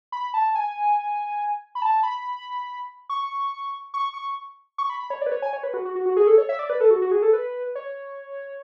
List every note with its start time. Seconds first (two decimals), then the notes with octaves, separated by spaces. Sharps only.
0.12 B5
0.34 A5
0.55 G#5
1.75 B5
1.82 A5
2.03 B5
3.10 C#6
3.94 C#6
4.14 C#6
4.78 C#6
4.90 B5
5.00 B5
5.10 C#5
5.21 D5
5.26 B4
5.32 C#5
5.42 G#5
5.53 C#5
5.63 B4
5.74 F#4
5.85 F#4
5.96 F#4
6.06 F#4
6.17 G#4
6.27 A4
6.38 C#5
6.49 E5
6.59 D5
6.70 B4
6.80 A4
6.91 F#4
7.02 F#4
7.11 G#4
7.22 A4
7.33 B4
7.75 C#5